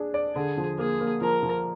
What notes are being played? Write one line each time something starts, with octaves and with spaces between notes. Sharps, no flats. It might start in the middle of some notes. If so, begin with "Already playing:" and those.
Already playing: D4 G#4
D5
D3 G#4
F3
A#3 G#4
A#3
F3 A#4
F3